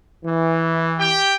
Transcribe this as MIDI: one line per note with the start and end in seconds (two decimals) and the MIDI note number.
0.24 1.18 52
0.99 1.34 67
0.99 1.34 79